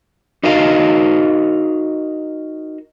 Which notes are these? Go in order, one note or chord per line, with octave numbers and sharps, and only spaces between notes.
D#4 F#4 A#4 D#5 F5